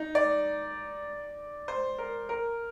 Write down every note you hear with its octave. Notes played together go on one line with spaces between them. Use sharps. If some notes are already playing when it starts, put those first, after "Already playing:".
Already playing: D#4
D5
C5
A#4
A#4